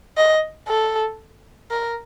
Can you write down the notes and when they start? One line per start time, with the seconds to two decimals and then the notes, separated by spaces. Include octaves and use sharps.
0.17 D#5
0.68 A4
1.71 A#4